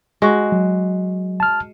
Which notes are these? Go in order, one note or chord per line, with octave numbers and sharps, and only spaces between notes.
G#3 F#4
F#3
A5 F6